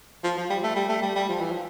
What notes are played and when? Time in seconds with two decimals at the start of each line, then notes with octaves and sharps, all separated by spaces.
0.24 F3
0.38 F3
0.50 G3
0.63 A3
0.76 G3
0.89 A3
1.02 G3
1.15 G3
1.28 F3
1.40 E3
1.52 F3